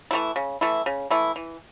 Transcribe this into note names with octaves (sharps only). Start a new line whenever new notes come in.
E3 A3 E4
C#3
E3 A3 E4
C#3
E3 A3 E4
E3